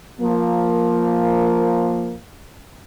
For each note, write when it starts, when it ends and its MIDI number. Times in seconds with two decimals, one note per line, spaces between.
0.20 2.15 53
0.20 2.15 58